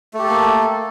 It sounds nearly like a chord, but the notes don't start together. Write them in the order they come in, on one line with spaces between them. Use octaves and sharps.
A3 G4 A4 A#3